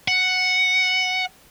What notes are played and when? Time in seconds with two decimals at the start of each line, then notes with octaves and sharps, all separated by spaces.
0.08 F#5